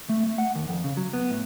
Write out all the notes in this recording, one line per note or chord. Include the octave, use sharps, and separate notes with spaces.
A3
A3
F#5
D#2
F2
C#3
F#3
B3
A2